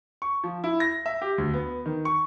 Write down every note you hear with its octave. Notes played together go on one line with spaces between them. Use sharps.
C#6
F3
E4
A#6
E5
G4
D2
B3
D#3
C#6